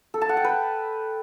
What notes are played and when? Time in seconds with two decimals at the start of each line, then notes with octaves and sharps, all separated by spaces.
0.14 A4
0.22 A5
0.29 F#5
0.37 G5
0.44 B4